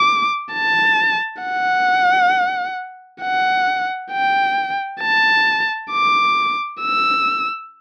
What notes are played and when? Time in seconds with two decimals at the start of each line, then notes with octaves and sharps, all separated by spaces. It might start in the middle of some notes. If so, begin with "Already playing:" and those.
Already playing: D6
0.53 A5
1.42 F#5
3.22 F#5
4.11 G5
5.01 A5
5.91 D6
6.81 E6